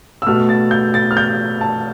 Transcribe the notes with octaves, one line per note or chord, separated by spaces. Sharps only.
E6
B2 A3 F6
A6
G6
A6
F6
G6
A5